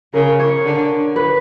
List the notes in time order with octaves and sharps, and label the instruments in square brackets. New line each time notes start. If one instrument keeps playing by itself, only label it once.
[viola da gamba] C#3 [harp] A#4
[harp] C#5
[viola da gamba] D3
[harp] B4